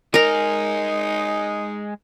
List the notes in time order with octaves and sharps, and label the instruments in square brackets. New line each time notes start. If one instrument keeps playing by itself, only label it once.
[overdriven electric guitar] G#3 G#4 [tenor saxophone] D#4 [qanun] A#4 A#5